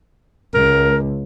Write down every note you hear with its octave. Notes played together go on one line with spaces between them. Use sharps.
C#2 A#4